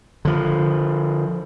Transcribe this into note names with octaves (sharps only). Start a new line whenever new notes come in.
D3 F3